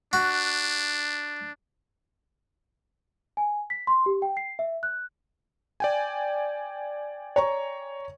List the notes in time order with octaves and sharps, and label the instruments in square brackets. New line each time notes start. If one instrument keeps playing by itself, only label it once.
[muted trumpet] D4 [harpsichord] F#4
[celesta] G#5
B6
C6
G4
G5
C7
E5
F#6
[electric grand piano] D5 G5 G#5
[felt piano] C#5 A#5 C#6